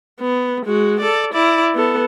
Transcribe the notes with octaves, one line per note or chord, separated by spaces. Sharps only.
B3
G#3 F#4
A4 D5
E4 D5
B3 A4